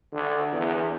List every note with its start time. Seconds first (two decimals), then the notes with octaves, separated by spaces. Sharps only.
0.13 D3
0.52 E2